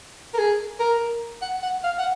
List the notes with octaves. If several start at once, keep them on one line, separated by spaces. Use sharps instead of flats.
A#4
G#4
A#4
F#5
F#5
F5
F#5